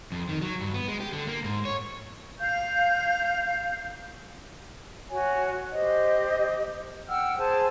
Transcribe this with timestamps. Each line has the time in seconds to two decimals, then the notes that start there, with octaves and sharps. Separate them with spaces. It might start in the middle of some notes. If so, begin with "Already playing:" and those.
0.12 F2
0.29 D#3
0.42 F#3
0.61 G2
0.74 B3
0.88 G#3
1.00 G4
1.13 D3
1.27 A#3
1.44 G#2
1.65 C#5
2.40 F5 G6
5.09 F#4 C#5 G#5
5.71 G4 C5 D#5
7.08 F#5 G5 E6 F6
7.37 G#4 C5 G#5 A5